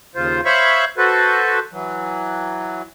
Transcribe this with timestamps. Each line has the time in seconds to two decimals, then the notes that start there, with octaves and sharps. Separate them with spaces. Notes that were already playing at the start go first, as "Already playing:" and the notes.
0.15 D#2 C#3 F4 C5
0.45 C5 C#5 E5 F5 B5 C#6
0.98 F#4 A4 B4 C5
1.72 E3 F#3